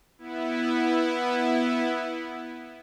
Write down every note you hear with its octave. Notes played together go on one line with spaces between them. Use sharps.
B3 E4